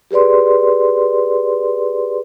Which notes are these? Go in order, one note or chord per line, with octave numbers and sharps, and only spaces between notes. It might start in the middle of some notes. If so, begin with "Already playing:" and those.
G4 G#4 B4 D5 C6